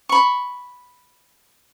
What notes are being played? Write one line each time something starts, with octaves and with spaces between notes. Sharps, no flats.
B5 C#6